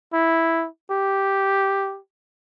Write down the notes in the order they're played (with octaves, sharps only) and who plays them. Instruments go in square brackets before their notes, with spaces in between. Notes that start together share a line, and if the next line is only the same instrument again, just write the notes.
[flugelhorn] E4
G4